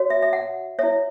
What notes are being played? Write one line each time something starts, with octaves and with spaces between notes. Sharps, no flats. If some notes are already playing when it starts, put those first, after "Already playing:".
Already playing: F#4 C#5
E5
E5
F#5
E4 C#5 E5